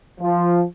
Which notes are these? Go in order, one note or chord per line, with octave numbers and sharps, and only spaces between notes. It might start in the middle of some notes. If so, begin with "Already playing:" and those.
F3